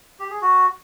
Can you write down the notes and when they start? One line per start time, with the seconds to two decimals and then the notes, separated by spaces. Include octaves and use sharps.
0.20 G4
0.31 G#4
0.42 F#4